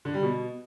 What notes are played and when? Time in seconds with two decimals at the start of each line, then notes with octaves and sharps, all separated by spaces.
0.05 D3
0.14 G3
0.23 B2